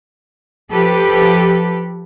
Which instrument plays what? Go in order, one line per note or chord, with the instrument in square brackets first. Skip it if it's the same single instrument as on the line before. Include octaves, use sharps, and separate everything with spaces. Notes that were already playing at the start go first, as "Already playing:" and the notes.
[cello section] F3 G4 A4 B4